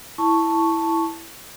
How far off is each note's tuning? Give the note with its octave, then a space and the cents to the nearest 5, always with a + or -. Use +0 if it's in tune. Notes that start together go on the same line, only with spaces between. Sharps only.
E4 +0 A5 +0 C#6 +0